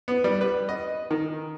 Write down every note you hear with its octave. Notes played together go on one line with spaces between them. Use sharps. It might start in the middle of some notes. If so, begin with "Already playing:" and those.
B3
G3
B4
D#5
D#3